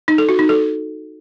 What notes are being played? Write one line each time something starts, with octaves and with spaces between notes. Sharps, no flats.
D#4
A4
F#4
D#4
A4